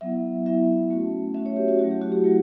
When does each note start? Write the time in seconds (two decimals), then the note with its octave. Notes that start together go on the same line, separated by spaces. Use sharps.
0.01 F#3 B3 E4 E5
0.46 F#3 B3 E4 E5
0.90 A3 C#4 F#4
1.34 A3 C#4 F#4 E5
1.46 C#5
1.57 G4
1.68 F#4
1.79 F#3 A3 E4 F#4
1.91 G4
2.02 F#4
2.12 G4
2.24 F#3 A3 E4